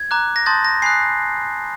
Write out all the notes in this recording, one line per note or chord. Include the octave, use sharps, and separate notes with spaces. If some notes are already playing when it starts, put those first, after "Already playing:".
Already playing: G#6
A#5 D6 F#6
A#6
A5 C6 D#6 G6 A6
A#6
G#5 B5 D#6 F#6 C7